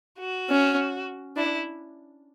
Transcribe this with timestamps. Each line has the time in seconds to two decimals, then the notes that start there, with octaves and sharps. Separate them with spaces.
0.19 F#4
0.49 C#4
1.36 D4 E4